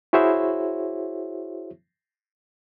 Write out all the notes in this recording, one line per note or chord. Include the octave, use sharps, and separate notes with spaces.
E4 F#4 G#4 C5 C#5 E5